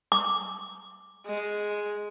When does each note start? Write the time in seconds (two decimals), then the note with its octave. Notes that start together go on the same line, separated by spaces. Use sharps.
0.12 D6
1.26 G#3